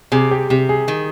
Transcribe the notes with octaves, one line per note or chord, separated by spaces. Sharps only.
C3 G#4
G4
C3 G4
G#4
D#3